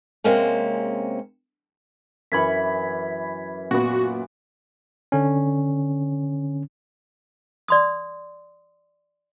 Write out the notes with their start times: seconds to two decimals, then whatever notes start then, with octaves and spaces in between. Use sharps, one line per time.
0.24 C3 G#3 A#3 C4 C#4
2.32 F#2 E3 B5 C#6 G#6 B6
3.71 A#2 B3 F#4 D5
5.12 D3 C#4
7.68 D5 C6 D#6